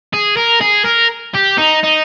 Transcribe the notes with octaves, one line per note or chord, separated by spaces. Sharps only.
G#4
A#4
G#4
A#4
G4
D#4
D#4